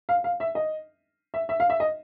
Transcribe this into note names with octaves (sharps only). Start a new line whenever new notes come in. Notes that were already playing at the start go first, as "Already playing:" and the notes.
F5
F5
E5
D#5
E5
E5
F5
E5
D#5